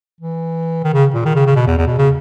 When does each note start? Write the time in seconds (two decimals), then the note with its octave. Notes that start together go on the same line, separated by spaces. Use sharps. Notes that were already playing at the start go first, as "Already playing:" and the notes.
0.21 E3
0.84 D#3
0.94 C#3
1.14 A#2
1.25 D#3
1.36 C#3
1.47 C#3
1.56 B2
1.67 E2
1.78 E2
1.87 B2
1.98 C#3